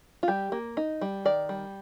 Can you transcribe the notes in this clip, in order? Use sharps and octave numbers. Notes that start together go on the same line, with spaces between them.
F4
G3 G4
A#3
D#4
G3
D#3 D5
G3